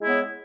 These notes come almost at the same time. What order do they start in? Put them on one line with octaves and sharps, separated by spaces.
G#3 E4 B3 C#5